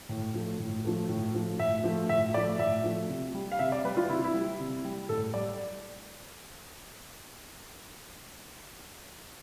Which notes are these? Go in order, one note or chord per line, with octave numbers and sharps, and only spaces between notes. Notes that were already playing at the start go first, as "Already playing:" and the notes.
A2
F3 A3
A2
F3 A3
A2
F3 A3
A2 E5
F3 A3
A2 E5
F3 A3 D5
A2 E5
F3 A3
C3
G3
F5
C3 E5
D5
G3 B4
F4
C3 E4
E4
G3
C3
G3
A2 A4
G3 D5